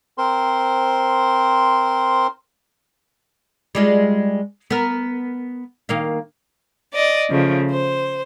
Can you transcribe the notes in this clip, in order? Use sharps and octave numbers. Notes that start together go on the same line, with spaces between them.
C4 A#4 C5 C6
G3 G#3 F4
B3 A#4
D#3 A#3 F5
D5 D#5
C#3 F3 A3
C5